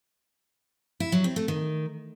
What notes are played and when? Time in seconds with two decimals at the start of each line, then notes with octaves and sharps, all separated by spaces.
1.00 E4
1.12 F#3
1.24 C4
1.36 A3
1.48 D#3